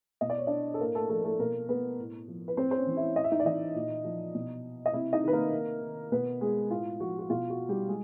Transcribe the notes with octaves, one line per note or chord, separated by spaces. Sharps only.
B2 D#5
D5
C#5
D4 D5
A4
A2 A#3 A#4
A3 A4
F3 A3 A4
A#4
A3 A4
B2 A#3 A#4
B3 B4
A2
F3
B4
A2 C4 C5
C5
C#4 C#5
E3
E4 E5
A2 D#5
E5
D#4 D#5
D5
E3 D#4 D#5
A#2
F3
B2
D#5
C3 E4 E5
D#4 D#5
D#3 B4
A#3 A#4
C3
D#3
B2 B3 B4
G#3 G#4
A2 F4
F3 F#4
F#4
B2 F4
F#4
G3 G4
G#3 G#4